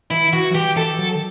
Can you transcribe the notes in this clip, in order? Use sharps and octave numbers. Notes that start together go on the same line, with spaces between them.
E3 E4
E3 F#4
F#3
E3 G4
E3 A4
F#3
D#3